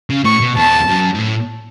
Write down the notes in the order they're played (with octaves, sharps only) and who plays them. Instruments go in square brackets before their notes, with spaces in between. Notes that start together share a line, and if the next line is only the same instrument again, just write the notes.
[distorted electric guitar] C#3
[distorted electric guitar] A2 [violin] C#6
[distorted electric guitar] B2
[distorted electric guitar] E2 [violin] A5
[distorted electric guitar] F#2
G#2
A2